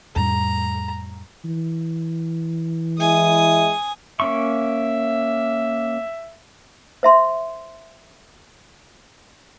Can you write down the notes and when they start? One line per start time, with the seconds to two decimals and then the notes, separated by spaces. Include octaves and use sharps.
0.16 F2 A2 G3 A#5
1.45 E3
2.99 G#3 E4 G#5 D#6
4.20 A#3 C#4 E5 C#6
7.03 C5 E5 C6